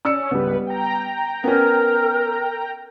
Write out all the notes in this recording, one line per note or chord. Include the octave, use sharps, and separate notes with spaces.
C#4 D5 E6 C#7
C#2 G2 G3 B3 B4
G5 A#5
B3 C#4 A#4